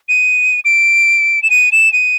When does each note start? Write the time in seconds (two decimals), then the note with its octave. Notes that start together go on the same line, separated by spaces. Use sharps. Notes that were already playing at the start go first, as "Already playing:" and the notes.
0.09 D#7
0.65 D7
1.43 E7
1.50 D#7
1.72 E7
1.93 D#7